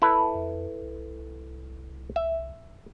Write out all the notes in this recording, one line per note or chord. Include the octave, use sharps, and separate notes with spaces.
E4 A4 B4
F2
C2
E5